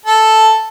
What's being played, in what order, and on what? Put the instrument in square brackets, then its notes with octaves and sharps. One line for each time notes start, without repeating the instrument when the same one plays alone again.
[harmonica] A4